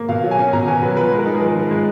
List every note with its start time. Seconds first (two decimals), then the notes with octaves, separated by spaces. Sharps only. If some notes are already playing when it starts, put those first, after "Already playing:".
Already playing: A#3
0.09 B2 F5
0.24 F#3
0.31 G#5
0.39 C#4
0.53 B2 A#5
0.68 B2 G#5
0.82 F#3 B4
0.97 F3 B4
1.11 G#3
1.19 A#4
1.26 D#4
1.34 G#4
1.41 F3 A#4
1.56 F3
1.71 G#3